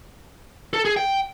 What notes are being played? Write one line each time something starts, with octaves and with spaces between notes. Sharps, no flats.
A4
G#4
G5